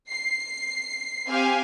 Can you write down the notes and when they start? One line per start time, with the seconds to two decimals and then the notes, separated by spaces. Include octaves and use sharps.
0.11 C7
1.28 C4 G4 F5 G#5